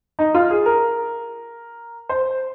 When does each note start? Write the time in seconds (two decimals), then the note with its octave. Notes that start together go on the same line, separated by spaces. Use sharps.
0.19 D#4
0.35 F4
0.50 G#4
0.66 A#4
2.09 C5